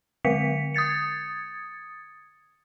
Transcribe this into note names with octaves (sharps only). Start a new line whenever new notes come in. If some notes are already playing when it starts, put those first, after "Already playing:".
D3 G#3 B6 C#7
D#6 G#6 A6 C#7